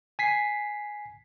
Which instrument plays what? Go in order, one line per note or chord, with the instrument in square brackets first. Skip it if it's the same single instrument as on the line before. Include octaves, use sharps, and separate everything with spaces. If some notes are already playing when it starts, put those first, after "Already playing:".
[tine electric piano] G#5 B6 C7